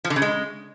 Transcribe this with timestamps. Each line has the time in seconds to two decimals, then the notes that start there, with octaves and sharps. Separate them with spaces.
0.05 F3
0.10 D3
0.16 C#3
0.22 G#3